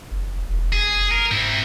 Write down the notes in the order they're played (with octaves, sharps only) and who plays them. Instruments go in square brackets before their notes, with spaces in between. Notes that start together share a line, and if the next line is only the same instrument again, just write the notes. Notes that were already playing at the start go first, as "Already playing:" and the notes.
[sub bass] F#1
E1
[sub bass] F#1 [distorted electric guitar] G#4
[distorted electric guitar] A#4
[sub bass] G#2 [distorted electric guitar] C4 E4